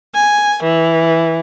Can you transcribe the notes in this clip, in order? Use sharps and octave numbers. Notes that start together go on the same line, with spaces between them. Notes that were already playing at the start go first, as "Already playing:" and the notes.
G#5
E3